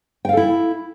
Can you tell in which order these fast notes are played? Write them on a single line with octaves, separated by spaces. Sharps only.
G5 F5 A4 E4